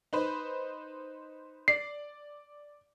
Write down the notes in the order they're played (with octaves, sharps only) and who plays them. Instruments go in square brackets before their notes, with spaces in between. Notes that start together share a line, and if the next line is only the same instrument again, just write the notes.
[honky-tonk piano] D#4 B4 C5
[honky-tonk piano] D5 [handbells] C7